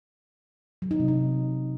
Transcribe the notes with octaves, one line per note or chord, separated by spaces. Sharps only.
F#3
D#4
C3
D#4